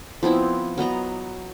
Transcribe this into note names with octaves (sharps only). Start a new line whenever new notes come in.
F3 B3 C4 E4
F#3 B3 D#5 A#5